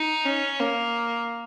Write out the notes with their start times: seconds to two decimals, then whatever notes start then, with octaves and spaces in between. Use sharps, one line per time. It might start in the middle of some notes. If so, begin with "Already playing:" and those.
Already playing: D#4
0.25 C#4
0.59 A#3